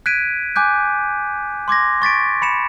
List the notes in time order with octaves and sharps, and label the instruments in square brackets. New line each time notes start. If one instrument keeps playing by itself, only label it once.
[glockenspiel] F#6 G#6 B6 D7 D#7
G#5 D6 F#6 G6
C6 D6 G#6 A#6
C#6 A6 B6 D7
B5 C#7 E7